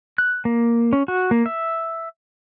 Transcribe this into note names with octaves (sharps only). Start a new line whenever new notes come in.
F#6
A#3
C#4
F#4
A#3
E5